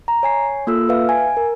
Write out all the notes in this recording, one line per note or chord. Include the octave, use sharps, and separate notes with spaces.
A#5
C#5 G#5 C7
A#3 F4 A4 E6
B4 E5 F5
G#5
A#4